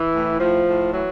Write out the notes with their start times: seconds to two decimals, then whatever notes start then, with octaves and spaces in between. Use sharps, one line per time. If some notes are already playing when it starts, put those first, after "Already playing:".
Already playing: E3
0.13 A2
0.40 A2 F3
0.67 A2
0.93 E3 F#3